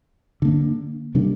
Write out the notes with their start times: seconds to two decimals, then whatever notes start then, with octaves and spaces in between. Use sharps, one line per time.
0.42 D3 A#3 D4
1.15 C3 G3 A#3 D4